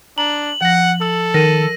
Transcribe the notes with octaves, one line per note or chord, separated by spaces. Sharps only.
D4 A#5 F#7
F3 F#5 A#6
A4 E6
D#3 A#4 A#6 D#7